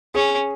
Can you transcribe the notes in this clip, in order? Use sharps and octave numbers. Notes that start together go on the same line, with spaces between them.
C#4 G#4